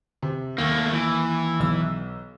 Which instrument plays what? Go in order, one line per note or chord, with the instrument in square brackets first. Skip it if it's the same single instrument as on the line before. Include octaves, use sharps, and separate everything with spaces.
[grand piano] C3
[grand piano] D#2 [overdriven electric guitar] A3 A#3
[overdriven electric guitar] E3
[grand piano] B1 E6